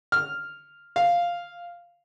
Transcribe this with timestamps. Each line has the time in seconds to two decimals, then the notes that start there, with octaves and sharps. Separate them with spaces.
0.12 F6
0.96 F5